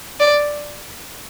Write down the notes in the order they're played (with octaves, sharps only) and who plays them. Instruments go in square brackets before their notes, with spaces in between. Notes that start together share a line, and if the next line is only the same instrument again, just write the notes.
[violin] D5